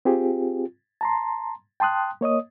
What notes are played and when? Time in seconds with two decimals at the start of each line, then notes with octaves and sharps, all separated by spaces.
0.05 C4 F4 G4 G#4
1.01 A5 A#5 C6
1.80 G5 A5 C6 D#6 F#6
2.21 A#3 C#5 D#5 D#6